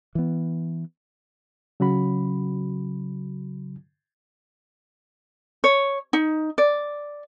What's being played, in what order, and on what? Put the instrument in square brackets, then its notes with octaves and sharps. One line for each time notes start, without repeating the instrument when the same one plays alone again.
[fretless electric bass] E3 B3
[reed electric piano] C#3 F#3 C#4 F#4 B5
[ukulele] C#5
D#4
D5